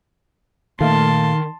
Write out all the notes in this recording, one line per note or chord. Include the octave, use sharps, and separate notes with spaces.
A#2 D#3 A3 F5 A5 C6